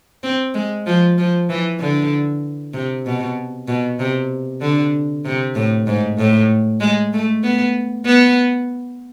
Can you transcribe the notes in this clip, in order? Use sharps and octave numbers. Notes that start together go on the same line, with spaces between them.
C4
G#3
F3
F3
E3
D3
C3
B2
B2
C3
D3
C3
A2
G#2
A2
G#3
A3
B3
B3